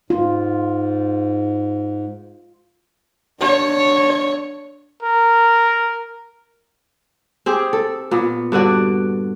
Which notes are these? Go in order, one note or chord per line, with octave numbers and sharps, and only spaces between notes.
G#2 F4
D4 C#5
A#4
C4 G4 G#4
A4
A#2 B3
G2 D3 F#4 D5